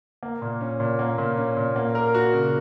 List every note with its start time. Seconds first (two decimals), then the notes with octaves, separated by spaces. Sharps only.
0.23 A#3
0.42 A#2
0.61 C#4
0.80 A#2
0.99 A#3
1.18 A#2
1.37 C#4
1.57 A#2
1.76 A#3
1.95 A#4
2.14 F#4
2.33 C#3